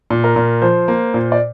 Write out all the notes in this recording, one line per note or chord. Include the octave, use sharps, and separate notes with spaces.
A#2
A#4
A#2
F3 C5
A#3
A#2
D5